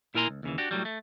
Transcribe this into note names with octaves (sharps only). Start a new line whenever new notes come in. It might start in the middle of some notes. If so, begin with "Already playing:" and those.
A#2 E4 A#4 G#5 A#5 C6
C#2
D#2 C#3 E3
D4 F#4 G4
A2 C3 F#3 G3
A3